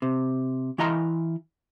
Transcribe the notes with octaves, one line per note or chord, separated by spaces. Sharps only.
C3
E3 E4 D#5 F5 A#5 C6